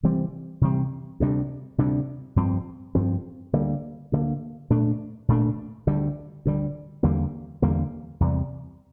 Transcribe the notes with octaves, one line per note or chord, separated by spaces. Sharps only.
C3 E3 G3 C4
C3 E3 G3 C4
D2 C3 G3 D4
D2 C3 G3 D4
G2 F3 C4
G2 F3 C4
D2 D3 G3 A#3
D2 D3 G3 A#3
A#2 A3 D4
A#2 A3 D4
D2 D3 G3
D2 D3 G3
E2 D3 G3 A#3
E2 D3 G3 A#3
E2 C3 G3